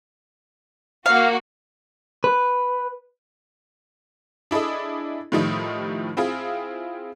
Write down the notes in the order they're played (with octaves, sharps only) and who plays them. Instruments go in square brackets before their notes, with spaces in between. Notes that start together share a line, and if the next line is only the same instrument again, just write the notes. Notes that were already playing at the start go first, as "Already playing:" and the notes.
[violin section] A#3 F#4 [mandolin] F5
[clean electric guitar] B4
[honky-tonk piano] D4 E4 G#4 A4 D#5
A2 D#3 F3 G3 D#4 E4
C4 E4 F4 G#4